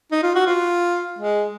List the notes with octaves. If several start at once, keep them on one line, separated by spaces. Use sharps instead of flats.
D#4
F4
F#4
F4
G#3